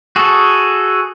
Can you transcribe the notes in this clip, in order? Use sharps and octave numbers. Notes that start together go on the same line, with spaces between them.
F#4 G#4 A4